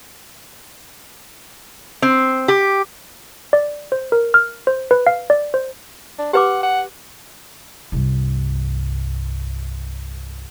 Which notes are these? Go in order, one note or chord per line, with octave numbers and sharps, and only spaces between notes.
C4
G4
D5
C5
A#4
F6
C5
B4
F5
D5
C5
D4
G4 B4 F#5 D6
F#5
C2 G2